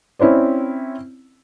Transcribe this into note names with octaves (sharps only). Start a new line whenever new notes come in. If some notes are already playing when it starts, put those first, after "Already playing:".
C4 C#4 E4 C5 D5